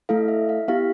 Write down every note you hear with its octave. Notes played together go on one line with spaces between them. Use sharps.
A3 E4 A4 F5
E5
F5
B3 E4 G4 F5